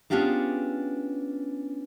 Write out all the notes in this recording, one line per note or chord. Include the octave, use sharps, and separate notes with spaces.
B3 C#4 D4 F4 G4 G#4